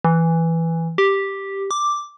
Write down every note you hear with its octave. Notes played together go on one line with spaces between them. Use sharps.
E3
G4
D6